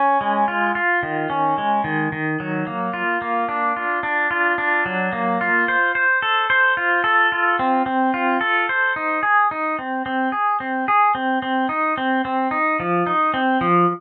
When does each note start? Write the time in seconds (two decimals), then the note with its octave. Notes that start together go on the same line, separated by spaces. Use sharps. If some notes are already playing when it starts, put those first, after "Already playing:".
Already playing: C#4
0.21 G#3
0.48 F4
0.75 F4
1.03 D#3
1.30 C#4
1.58 G#3
1.84 D#3
2.12 D#3
2.40 F#3
2.67 A#3
2.94 F4
3.22 A#3
3.49 D4
3.76 F4
4.03 D4
4.31 F4
4.58 D4
4.86 F#3
5.13 A#3
5.41 F4
5.68 C5
5.95 C5
6.22 A4
6.50 C5
6.77 F4
7.04 A4
7.32 F4
7.59 C4
7.86 C4
8.14 F4
8.41 A4
8.69 C5
8.96 D#4
9.23 G#4
9.51 D#4
9.79 C4
10.06 C4
10.32 G#4
10.60 C4
10.88 G#4
11.15 C4
11.42 C4
11.69 D#4
11.98 C4
12.25 C4
12.51 D#4
12.80 F3
13.07 D#4
13.34 C4
13.61 F3